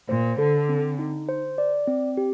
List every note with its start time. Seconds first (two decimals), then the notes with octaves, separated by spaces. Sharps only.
0.09 A#2 C5
0.38 D3 A4
0.69 C4
0.99 D#4
1.29 C5
1.58 D5
1.87 C4
2.17 G4